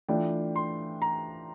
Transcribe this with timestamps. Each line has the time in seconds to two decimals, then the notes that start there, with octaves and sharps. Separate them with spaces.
0.09 E3 A3 D4 F4 G5
0.56 C6
1.02 A#5